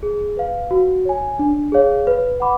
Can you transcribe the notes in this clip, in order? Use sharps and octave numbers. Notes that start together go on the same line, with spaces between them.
G#4
B4 F5
F#4
C#5 G#5
D4
G#4 C#5 F5
B4
F#5 B5 D6